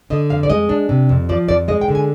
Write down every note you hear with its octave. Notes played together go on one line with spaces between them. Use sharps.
D3 D#5
F2 F5
D5
G#3 D#5
D4
C3
F2
F3 D5
F2 D5
G#3 D#5
G5
D3
G#5